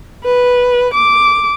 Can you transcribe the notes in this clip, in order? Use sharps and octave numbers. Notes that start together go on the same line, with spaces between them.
B4
D6